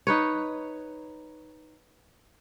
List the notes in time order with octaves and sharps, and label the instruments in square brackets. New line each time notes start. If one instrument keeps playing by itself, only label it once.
[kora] D#4 B4 C#5